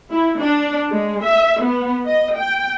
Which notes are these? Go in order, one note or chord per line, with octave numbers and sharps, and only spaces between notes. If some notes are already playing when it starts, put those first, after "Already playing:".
E4
D4
G#3
E5
B3
D#5
G5